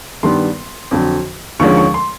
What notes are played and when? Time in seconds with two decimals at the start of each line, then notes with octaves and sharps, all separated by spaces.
0.23 G2 D#3 G3 B3 C6
0.91 F2 D3 F#3
1.59 D#2 D3 F3 G#3 C#4 C#6
1.77 C#6
1.94 C6